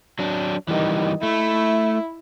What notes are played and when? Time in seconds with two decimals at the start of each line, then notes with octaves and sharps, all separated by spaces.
0.19 F#3 D4
0.68 D#3 E3 G3 D#4
1.23 A3 E4